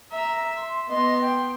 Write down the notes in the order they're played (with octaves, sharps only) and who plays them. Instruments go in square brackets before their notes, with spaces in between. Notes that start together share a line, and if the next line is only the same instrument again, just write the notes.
[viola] E5 [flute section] A#5
[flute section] C6
[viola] B3 C6 [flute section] D#5
[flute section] G5